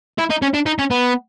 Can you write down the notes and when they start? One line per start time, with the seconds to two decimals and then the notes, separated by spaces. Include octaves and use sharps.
0.18 E4
0.30 D#4
0.42 C#4
0.54 D4
0.66 D#4
0.79 C#4
0.91 B3